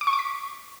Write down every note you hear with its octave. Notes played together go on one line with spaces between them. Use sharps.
D6
C#6
D6
B6